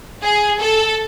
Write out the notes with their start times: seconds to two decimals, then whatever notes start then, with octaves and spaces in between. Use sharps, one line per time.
0.23 G#4
0.62 A4